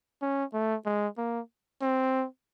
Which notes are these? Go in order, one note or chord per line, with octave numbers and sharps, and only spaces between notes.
C#4
A3
G#3
A#3
C4